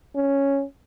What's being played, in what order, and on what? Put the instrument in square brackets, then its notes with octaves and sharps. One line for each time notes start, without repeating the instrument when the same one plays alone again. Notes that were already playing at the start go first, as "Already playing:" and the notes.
[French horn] C#4